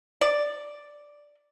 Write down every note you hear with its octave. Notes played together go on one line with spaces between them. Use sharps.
D5